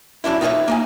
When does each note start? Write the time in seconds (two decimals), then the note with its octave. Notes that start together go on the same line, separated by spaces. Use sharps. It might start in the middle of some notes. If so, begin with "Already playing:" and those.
0.24 F#2 C#4 D4 E4
0.41 D#4 F4 G4 B4 C#5 E5
0.68 A#3 D#4 G#5